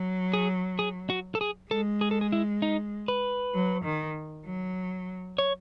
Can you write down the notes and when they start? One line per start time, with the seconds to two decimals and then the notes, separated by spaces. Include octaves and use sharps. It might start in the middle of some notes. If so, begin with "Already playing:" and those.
Already playing: F#3
0.33 G#4
0.79 G#4
1.10 F#4
1.35 A4
1.41 G#4
1.71 G#3 A4
2.01 G#4
2.11 A4
2.21 G#4
2.32 E4
2.62 D#4
3.08 B4
3.54 F#3
3.84 D#3
4.46 F#3
5.38 C#5